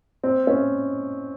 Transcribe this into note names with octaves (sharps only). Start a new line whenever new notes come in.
C4
C#4